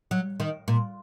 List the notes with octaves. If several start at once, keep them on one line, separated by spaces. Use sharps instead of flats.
F#3
D#3
A#2